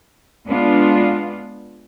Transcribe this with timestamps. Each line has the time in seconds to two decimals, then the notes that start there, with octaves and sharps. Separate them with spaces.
0.47 G#3 B3 D4 F4